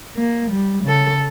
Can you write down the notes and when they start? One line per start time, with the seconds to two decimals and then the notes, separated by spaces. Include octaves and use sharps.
0.16 A#3
0.51 G3
0.84 C#3 A4